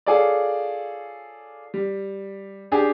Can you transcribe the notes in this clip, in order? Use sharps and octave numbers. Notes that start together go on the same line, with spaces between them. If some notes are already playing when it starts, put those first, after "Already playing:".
F4 G#4 A4 C#5 D5
G3
D4 G4 G#4